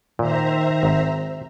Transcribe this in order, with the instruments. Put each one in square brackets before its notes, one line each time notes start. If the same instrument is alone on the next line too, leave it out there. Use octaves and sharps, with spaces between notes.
[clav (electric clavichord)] A#2 [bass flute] D#3 [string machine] C5 E5 A#5
[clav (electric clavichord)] G#1